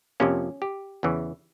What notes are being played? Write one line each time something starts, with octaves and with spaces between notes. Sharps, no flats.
F2 C3 F3 A#3 C#4
G4
E2 C#3 E3